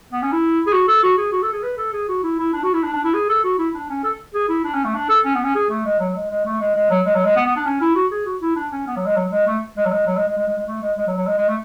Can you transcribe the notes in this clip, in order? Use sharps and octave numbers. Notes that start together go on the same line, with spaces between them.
B3
C#4
E4
G#4
F#4
A4
F#4
G#4
F#4
A4
G#4
B4
A4
G#4
F#4
E4
E4
D4
F#4
E4
D4
D4
E4
G#4
A4
F#4
E4
D4
C#4
A4
G#4
E4
D4
C#4
A3
D4
A4
C#4
B3
C#4
G#4
A3
G#3
F#3
G#3
G#3
A3
G#3
G#3
F#3
G#3
F#3
G#3
B3
B3
D4
C#4
E4
F#4
G#4
F#4
E4
D4
C#4
B3
F#3
G#3
F#3
G#3
A3
G#3
F#3
G#3
F#3
G#3
G#3
G#3
G#3
G#3
A3
G#3
G#3
F#3
F#3
G#3
G#3
A3